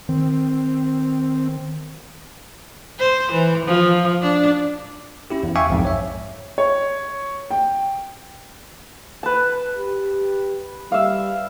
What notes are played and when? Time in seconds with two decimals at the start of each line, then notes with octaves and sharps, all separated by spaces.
0.09 D#3 C4
2.99 C5
3.32 E3
3.66 F3
4.21 D4
5.30 C#4 E4 G4
5.43 E2
5.56 E5 F5 G5 G#5 C#6 D6
5.70 B1 F2 G#2
5.85 C#5 E5
6.58 C#5
7.51 G5
9.23 B4 A5
9.78 G4
10.92 G3 E5 F5